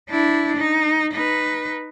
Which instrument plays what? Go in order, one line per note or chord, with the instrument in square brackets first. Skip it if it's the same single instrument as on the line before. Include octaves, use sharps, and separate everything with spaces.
[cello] D4 E4
D#4
D#4 B4